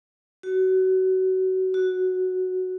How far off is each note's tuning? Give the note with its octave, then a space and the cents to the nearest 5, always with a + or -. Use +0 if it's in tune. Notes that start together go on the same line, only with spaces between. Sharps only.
F#4 +25
F#4 +0